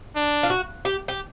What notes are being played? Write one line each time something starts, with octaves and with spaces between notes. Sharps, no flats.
D4
F4
F#4
G4
G4